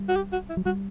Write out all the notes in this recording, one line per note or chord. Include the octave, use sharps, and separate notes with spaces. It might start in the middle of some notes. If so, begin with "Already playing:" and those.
Already playing: G3
F#4
G4
F#4
E4
F#3
G3 F#4